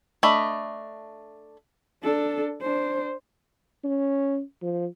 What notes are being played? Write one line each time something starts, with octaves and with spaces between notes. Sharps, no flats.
A3 D4 D#5 B5
D4 A4
D4 C5
C#4
F3